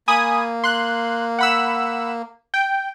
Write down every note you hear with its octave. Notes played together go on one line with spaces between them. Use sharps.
A#3 G#5 B5 D#6
C6 F#6
F#5 B5 E6
G5